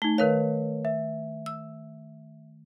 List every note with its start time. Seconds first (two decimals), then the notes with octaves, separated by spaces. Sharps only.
0.02 A3 D#4 G7
0.18 D#3 A#4 B4 C#5 F5
0.85 E5
1.46 E6